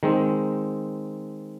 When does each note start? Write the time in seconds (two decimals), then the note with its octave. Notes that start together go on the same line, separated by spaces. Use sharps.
0.03 D#3 G#3 C4